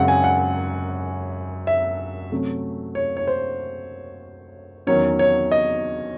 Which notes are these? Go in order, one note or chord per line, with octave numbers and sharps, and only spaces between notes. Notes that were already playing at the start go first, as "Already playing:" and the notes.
Already playing: F#2 C#3 G#3 C4 F#5
G#5
F#5
E5
C3 F#3 A3 C#4
C#5
C#5
C5
E2 D#3 F#3 C#4 C#5
C#5
D#5